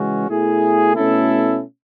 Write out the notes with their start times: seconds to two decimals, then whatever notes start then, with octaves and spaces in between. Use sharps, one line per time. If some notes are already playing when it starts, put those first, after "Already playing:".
Already playing: C#3 E3 G#3 C#4 F#4
0.28 B2 A3 E4 G#4
0.95 B2 A3 C#4 E4 A4